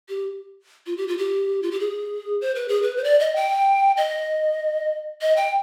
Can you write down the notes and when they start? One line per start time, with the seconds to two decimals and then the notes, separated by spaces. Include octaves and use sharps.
0.09 G4
0.86 F4
0.97 G4
1.08 F4
1.18 G4
1.62 F4
1.71 G4
1.80 G#4
2.41 C5
2.55 B4
2.68 G#4
2.82 B4
2.97 C5
3.04 D5
3.19 D#5
3.36 G5
3.97 D#5
5.21 D#5
5.36 G5